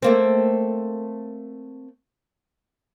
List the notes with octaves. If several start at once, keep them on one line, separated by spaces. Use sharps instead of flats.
A3 A#3 C4